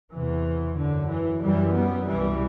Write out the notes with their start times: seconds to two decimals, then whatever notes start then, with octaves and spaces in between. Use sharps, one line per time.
0.12 E2 C3 E3
0.77 F#2 D3
1.09 E3
1.42 F#2 E3 G3
1.74 G3 B3
2.07 C2 B2 E3 G3